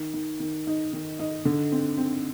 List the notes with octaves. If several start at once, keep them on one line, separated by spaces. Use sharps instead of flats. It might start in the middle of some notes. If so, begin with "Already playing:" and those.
Already playing: D#3
D#3
D#3
D#4
D#3
D#4
D3
C4
C4